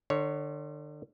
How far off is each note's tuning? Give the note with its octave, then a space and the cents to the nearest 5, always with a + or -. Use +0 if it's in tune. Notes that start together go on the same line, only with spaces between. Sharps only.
D3 +35 C#5 +0